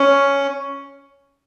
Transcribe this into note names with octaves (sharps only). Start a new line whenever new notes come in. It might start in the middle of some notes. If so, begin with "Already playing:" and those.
Already playing: C#4